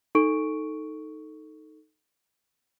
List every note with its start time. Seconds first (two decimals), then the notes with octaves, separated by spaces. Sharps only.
0.15 D#4 A4 C#6 D7